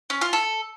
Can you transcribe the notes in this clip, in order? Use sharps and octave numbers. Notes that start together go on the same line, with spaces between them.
C#4
F4
A4